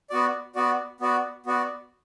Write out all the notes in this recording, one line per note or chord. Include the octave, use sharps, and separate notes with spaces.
B3 F#4 D5
B3 F#4 D5
B3 F#4 D5
B3 F#4 D5